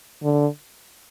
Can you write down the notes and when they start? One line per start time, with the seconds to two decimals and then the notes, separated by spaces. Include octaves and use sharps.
0.23 D3